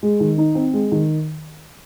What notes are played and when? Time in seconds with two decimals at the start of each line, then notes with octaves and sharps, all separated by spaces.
0.03 G#3
0.20 D#3
0.38 D#4
0.55 C4
0.73 G#3
0.92 D#3